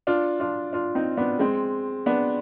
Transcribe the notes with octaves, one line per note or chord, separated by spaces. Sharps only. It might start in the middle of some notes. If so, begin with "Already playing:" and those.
D4 F4
D4 F4
D4 F4
C4 D#4
B3 D4
G#3 C4
B3 D4